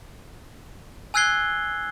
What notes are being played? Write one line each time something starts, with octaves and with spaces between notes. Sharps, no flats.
G#5 E6 F#6 G#6 C7 G7